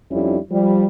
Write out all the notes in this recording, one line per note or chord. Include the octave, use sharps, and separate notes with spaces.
F2 G3 C#4 D#4 E4
F3 G3